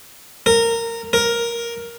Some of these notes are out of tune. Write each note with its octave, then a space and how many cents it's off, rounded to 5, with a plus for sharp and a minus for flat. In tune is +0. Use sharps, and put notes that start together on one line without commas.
A#4 -15
A#4 +10